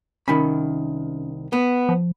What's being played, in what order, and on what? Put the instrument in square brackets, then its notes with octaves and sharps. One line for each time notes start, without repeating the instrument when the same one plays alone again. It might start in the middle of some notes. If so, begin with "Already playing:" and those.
[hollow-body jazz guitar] C2 D#3 B5 [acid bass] C#4
[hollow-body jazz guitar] B3
[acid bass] F3